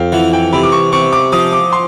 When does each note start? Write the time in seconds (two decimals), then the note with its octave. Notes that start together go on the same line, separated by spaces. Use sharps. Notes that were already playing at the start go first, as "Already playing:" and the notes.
Already playing: F2 F5 G5
0.12 E3 F#5
0.33 G5
0.53 C3 B5
0.63 D6
0.72 C#6
0.92 C3 C#6
1.13 D6
1.32 F3 D#6
1.53 D6
1.73 C6